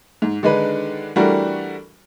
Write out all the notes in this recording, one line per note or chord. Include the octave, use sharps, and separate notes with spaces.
G#2
D3 D#3 G#3 D4 D#4 B4
E3 G3 A3 D4 F#4 A#4